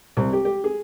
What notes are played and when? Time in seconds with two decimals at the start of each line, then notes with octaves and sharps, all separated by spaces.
0.17 C2
0.33 G4
0.45 G4
0.64 G#4